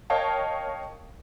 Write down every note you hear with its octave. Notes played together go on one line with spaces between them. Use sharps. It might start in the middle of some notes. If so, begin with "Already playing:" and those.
A#4 C#5 D#5 F5 G5 A5